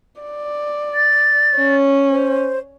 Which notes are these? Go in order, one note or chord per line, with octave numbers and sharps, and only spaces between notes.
D5
A6
C#4
C5